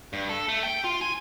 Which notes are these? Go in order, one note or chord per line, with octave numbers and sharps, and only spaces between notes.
G2
A4
A3
G5
F4
G#5